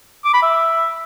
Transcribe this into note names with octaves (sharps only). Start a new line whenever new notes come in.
D6
B5
E5